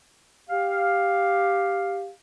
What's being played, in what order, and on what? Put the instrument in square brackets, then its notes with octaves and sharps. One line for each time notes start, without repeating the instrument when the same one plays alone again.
[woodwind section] G4 F5